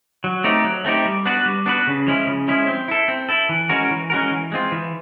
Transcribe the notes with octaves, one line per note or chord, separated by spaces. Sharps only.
F#3
A3 C4 D#4 G4
F#3
A3 C4 D#4 G4
G3
B3 D4 F#4 B4
G3
B3 D4 F#4 B4
C#3
F3 G#3 C#4 E4
C#3
F3 G#3 C#4 E4
C4
E4 A4
C4
E4 A4
E3
G#3 C#4 F#4 A#4
E3
G#3 C#4 F#4 A#4
E3
G#3 C4 F4
E3